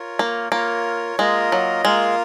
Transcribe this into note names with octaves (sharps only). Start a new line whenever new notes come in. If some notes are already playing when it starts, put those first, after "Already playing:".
Already playing: F4 A#4 C#5
A#3
A#3 F4 A#4 C#5
G#3 A#3 F4 A#4 D#5
F#3
G#3 A#3 F4 A#4 F5